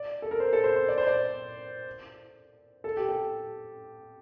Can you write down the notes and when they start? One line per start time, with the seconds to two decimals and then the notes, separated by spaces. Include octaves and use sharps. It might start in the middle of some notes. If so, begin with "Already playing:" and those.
Already playing: D5
0.22 A4
0.31 A#4
0.40 C5
0.53 A4
0.64 C5
0.76 C5
0.88 D5
0.98 C5
1.07 D5
2.84 A4
2.97 G4
3.09 A4